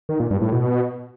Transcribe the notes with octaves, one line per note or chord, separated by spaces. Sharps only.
D#3
A#2
G2
A2
B2